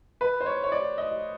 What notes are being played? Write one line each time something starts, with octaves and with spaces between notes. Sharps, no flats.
B4
C5
C#5
C#5
D5
D#5